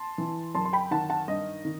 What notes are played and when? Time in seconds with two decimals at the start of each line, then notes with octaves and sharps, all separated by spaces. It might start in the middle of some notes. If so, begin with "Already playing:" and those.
Already playing: A5 C6
0.18 E3
0.55 F#2 A5 C6
0.65 C6
0.73 G5 B5
0.91 D#3 F#5 A5
1.10 F#5 A5
1.28 G2 D#5
1.65 D#3